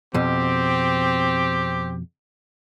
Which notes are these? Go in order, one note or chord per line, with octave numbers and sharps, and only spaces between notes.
F2 B2 C4 G4